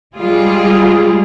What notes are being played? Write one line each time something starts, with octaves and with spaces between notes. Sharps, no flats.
G3 G#3 F4 G#4